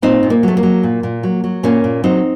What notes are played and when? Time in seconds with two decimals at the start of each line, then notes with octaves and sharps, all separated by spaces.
0.02 A#2 C4 D#4
0.23 A#2
0.30 A#3
0.43 F#3 A3
0.57 A#3
0.63 F#3
0.83 A#2
1.03 A#2
1.23 F#3
1.44 F#3
1.63 A#2 A#3 C#4
1.84 A#2
2.04 F#3 C4 D#4